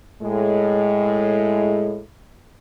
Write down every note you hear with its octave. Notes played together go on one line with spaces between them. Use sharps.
A2 G#3